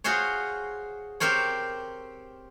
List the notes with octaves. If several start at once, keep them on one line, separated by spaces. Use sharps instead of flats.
F4 F#4 G#4 C5 C#5
C4 G4 A#4 C5 C#5